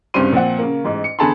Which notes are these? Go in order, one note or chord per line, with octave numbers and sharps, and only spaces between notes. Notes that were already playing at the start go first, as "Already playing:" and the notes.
C2 G2 C#3 C4 C6 D#7
A#2 F3 C4 F#5
C#3 A#3
A1 G#2
C#7
E2 D3 G#4 A5 B5 C6